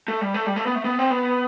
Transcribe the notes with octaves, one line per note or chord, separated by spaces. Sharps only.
A3
G3
A3
G3
A3
B3
A3
B3
C4
B3